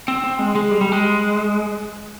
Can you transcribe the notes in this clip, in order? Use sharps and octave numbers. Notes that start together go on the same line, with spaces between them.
C4
C4
G#3
G#3
G3
G3
G#3